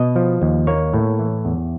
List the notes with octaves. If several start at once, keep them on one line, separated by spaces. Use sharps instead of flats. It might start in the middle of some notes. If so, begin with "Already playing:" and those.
Already playing: B2 D#5
F3
D#2
A#3 C#5
A2
E3
E2